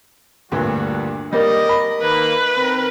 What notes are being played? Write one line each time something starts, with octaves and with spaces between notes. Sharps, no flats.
D2 G2 A#2 G3 D4 F#4
G3 A#3 A#4 D#5
A#4 B5
D#3 A#3 B4
D#3 C4 A#4